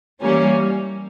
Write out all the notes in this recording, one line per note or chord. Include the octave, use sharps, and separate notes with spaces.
E3 G3 A#3 C#4